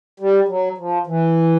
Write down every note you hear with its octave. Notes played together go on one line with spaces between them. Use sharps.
G3
F#3
F3
E3